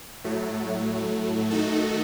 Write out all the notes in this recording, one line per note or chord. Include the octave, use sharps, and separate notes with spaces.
A2 F#3 A3
D#3 A3 D#4 F#4 A4